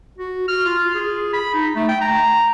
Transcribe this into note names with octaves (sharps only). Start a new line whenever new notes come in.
F#4
F6
F4
G#4
B5
D#4
A3
G5
A#5